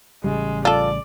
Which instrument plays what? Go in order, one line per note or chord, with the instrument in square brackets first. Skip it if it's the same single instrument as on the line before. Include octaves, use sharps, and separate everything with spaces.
[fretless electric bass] A1 C#3 G3 [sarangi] G#3
[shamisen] F4 A4 [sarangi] D5